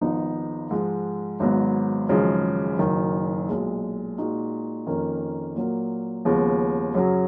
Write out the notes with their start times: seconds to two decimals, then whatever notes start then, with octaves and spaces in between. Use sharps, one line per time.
0.01 G#1 G#2 F3 B3 D#4
0.71 G#2 F3 G#3
1.40 G#1 G#2 F#3 B3
2.09 G#1 F#2 C#3 F3 G#3
2.79 F#1 F#2 D#3
3.48 B1 A#2 G#3
4.18 A#2 G#3 D#4 F#4
4.87 F2 D#3 A#3 C#4
5.55 A#2 F#3 A#3
6.25 D#2 C#3 F3 G#3 B3
6.95 F#2 C#3 F#3